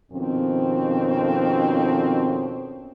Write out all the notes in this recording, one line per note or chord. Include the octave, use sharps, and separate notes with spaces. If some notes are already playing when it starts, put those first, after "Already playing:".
F2 B2 D#3 C4 C#4